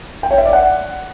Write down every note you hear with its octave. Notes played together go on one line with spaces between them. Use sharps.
G5
C#5
E5
D5
F#5